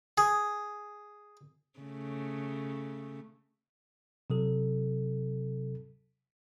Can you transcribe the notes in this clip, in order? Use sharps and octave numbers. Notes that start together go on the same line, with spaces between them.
G#4
C#3 A3
C3 F#3 A4